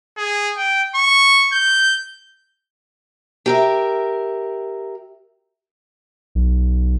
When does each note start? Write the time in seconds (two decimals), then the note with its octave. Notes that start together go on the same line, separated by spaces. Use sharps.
0.18 G#4
0.57 G5
0.95 C#6
1.53 G6
3.46 G4 A#4 E5
6.35 B1